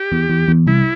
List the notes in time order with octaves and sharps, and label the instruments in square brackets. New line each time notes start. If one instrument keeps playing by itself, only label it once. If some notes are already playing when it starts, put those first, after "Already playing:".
Already playing: [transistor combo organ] G4
[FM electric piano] E2
E2
E2
[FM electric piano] C2 [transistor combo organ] E4